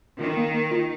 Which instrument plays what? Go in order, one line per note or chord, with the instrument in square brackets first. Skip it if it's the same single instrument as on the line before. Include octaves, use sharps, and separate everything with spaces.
[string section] D#3 [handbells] F4
[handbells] A#3
A#3
F4